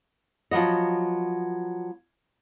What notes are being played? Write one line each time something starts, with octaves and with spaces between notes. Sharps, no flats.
F3 F#3 B3 D#5